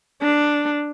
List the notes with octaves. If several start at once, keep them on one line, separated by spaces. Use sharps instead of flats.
D4